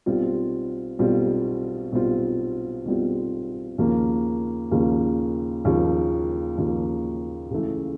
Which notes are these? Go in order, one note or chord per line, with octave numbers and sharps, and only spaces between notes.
B1 B2 G3 C4 F4
B1 B2 G3 C4 F4
B1 B2 G3 C4 F4
B1 B2 G3 C4 F4
D#2 C#3 F3 A#3
D#2 C#3 F3 A#3
D#2 C#3 F3 A#3
D#2 C#3 F3 A#3
C#2 C#3 E3 A3